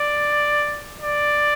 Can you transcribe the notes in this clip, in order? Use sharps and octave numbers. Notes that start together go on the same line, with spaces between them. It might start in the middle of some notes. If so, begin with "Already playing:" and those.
Already playing: D5
D5